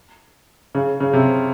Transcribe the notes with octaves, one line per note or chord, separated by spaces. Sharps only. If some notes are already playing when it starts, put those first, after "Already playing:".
C#3
C#3
C3